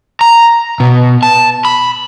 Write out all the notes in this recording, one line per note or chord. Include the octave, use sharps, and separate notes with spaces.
A#5
B2
A5
B5